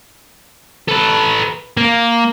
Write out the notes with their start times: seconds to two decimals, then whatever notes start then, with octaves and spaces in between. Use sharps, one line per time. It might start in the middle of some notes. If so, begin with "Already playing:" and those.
0.88 A4 B4
1.77 A#3